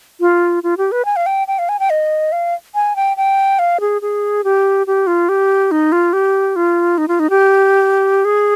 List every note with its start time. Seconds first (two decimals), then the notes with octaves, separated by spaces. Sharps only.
0.21 F4
0.63 F4
0.78 G4
0.92 B4
1.05 G#5
1.16 F5
1.26 G5
1.48 G5
1.59 F5
1.69 G#5
1.80 G5
1.90 D#5
2.32 F5
2.75 G#5
2.96 G5
3.17 G5
3.59 F5
3.80 G#4
4.02 G#4
4.44 G4
4.87 G4
5.07 F4
5.29 G4
5.71 D#4
5.92 F4
6.13 G4
6.56 F4
6.98 D#4
7.08 F4
7.19 D#4
7.30 G4
8.25 G#4